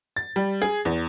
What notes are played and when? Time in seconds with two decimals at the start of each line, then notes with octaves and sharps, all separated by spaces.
0.17 A6
0.36 G3
0.62 G#4
0.85 E2